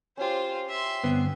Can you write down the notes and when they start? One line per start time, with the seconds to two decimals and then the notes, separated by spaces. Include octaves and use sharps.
0.17 C#4 F4 G4 C5
0.68 E5 C6
1.04 G2 D3 B3 C4